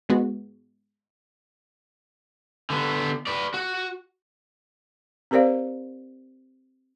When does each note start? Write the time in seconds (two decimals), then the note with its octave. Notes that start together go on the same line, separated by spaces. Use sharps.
0.09 G#2 G#3 B3 F#4
2.70 D3 B3
3.27 B4 D5
3.54 F#4
5.31 C4 G4 A#4 C5 D5 F5